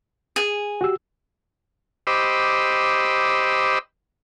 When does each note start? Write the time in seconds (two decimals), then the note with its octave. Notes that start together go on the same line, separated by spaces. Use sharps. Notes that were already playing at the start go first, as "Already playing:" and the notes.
0.36 G#4
0.81 F#4 G4 E6
2.07 G4 C5 D#5 B5 D6 E6